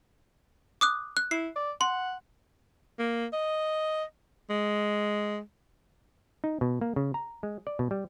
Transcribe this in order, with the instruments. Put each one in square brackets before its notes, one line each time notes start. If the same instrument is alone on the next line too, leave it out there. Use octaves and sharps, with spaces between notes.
[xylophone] D6 D#6 F#6
F#6
[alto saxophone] E4 [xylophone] C7
[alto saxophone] D5
[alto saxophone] F#5 [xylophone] C6
[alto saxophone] A#3
D#5
G#3
[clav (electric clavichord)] D#4
B2
A#3
C#3
A#5
G#3
D5
B2
G3